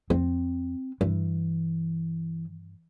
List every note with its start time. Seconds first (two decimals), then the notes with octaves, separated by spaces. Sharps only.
0.10 F2 C4
1.01 G2 E3